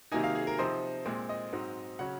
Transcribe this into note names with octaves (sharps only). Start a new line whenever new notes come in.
C3 D#3 F#3 A#3 D#4 G#5
F5
G#4
A#4
C3 F3 C4 D#4 C5
A#2 G#3 C4
D#5
G#2 F#3 C4 D#4
C#3 F#3 C#4 F#5